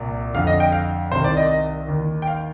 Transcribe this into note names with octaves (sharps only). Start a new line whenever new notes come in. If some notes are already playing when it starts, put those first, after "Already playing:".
Already playing: C2 A#2
F2 D3 F5
D#5
G5
F5
C2 C3 D#3 C5
D5
D#5
D#2 D#3
G5
F5